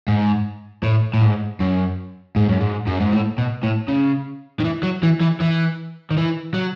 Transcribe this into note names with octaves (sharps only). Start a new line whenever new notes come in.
G#2
A2
A2
G#2
F#2
G#2
F#2
G#2
F#2
G#2
A2
B2
A2
C#3
D#3
E3
F#3
E3
E3
E3
D#3
E3
F#3